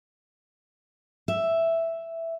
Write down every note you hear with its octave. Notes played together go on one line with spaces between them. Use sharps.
E5